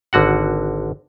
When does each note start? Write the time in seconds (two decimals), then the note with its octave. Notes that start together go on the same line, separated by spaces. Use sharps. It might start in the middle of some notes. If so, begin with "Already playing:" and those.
0.13 G#1 D3 F#4 F#5